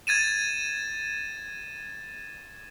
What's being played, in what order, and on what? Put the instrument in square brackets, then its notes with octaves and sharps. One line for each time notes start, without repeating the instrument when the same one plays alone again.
[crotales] G#6 A6 D#7 E7